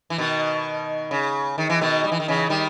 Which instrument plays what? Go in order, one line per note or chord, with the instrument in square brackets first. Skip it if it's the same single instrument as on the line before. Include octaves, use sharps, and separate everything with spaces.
[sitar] E3
B2 D#3
C#3
D#3
E3
B2 D#3
G3
E3
D#3
C#3 E3
D#3 G3